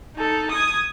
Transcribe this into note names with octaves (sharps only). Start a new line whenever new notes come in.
D#4 A4
D#6 G#6